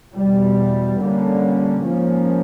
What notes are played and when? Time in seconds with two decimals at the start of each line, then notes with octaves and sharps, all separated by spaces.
0.14 E2 B2 G3
0.99 D3 G3 A#3 C#4
1.83 G#2 F3 A#3 C#4